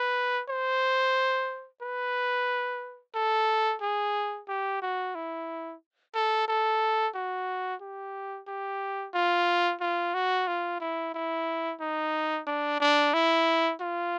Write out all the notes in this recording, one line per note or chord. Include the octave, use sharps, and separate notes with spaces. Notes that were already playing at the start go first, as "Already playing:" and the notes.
Already playing: B4
C5
B4
A4
G#4
G4
F#4
E4
A4
A4
F#4
G4
G4
F4
F4
F#4
F4
E4
E4
D#4
D4
D4
E4
F4